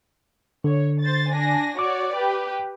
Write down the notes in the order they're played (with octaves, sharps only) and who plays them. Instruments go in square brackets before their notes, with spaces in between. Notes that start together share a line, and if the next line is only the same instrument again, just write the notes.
[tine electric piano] D3 [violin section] C#5
[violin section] C5 A6
D4 G#5 A#6
[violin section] F#4 C#5 D5 [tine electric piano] D6
[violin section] G4 B4